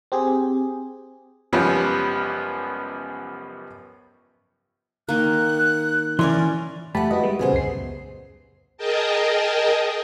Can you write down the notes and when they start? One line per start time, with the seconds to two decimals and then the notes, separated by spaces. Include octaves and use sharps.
0.12 C4 G4 G#4
1.53 C#2 F#2 F3 G3 B3 C#4
5.09 D#3 A#3 F#6
6.19 E3 C#4 E4 A#4 C#5 D5 C6
6.95 A3 G4 F#5 A5 B5
7.11 E4 F#4 B4 D#5
7.24 G3 G#3 B3
7.39 A#2 C#3 B3 G#4 C5
7.53 C#2 F#2 C7
8.77 G#4 A#4 D#5 G5 A5